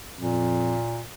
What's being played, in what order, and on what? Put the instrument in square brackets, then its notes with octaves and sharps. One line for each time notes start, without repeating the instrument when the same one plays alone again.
[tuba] F2 [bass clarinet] A#2